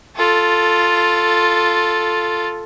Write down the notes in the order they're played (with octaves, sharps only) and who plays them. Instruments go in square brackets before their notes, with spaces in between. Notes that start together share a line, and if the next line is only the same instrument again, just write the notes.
[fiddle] F4 A4